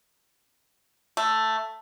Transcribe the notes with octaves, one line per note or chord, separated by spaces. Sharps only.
A3